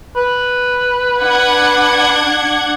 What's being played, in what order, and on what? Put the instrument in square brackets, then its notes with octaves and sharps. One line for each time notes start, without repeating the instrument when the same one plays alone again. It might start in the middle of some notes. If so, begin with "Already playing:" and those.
[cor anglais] B4
[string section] D4 F#5 G#6